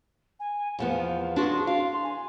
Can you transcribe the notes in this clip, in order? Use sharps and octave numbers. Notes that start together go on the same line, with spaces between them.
G#5
E2 F3 B3 F5
D4 F#4 G#4 C6
F5 C6
G#5